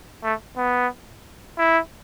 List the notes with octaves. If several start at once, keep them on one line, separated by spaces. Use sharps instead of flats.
A3
B3
E4